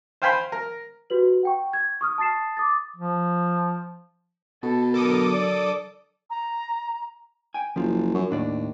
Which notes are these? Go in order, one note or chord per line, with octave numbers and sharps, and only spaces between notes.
C5 F5 G5 G#5 B5 C6
A#4
F#4 G4 B4 F#7
F#5 G5 C#6
G#6
C#6 D#6 F6
A5 D#6 A6 C7 E7
D6 D#6 A6
F3
B2 A4
D3 F#3 A4 A#4 D6 D#6
D5
A#5
G5 G#5
F#1 F3 F4
F#2
D#2 A2 D4 D5